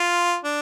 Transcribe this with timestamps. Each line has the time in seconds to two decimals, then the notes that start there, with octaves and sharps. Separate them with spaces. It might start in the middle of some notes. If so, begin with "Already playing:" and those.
Already playing: F4
0.44 D4